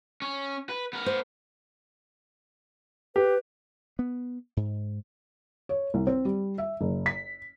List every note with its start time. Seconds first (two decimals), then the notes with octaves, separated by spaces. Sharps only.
0.22 C#4
0.69 B4
0.93 B3 A#4
1.06 C5
3.16 G4 B4
3.99 B3
4.57 G#2
5.69 C#5
5.94 C2
6.07 C4
6.25 G3
6.58 E5
6.81 F#1
7.06 B6